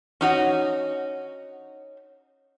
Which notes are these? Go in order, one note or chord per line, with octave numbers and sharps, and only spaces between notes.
C#4 D#4 F#4